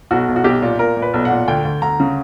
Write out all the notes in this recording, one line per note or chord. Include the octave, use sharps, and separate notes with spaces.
B1 F#4
B1
F#4
B1 G4
A#2
A#2 A#4
A#2
B4
B1
F#5
A#2
D2 G5
D2
D2 A#5
C#3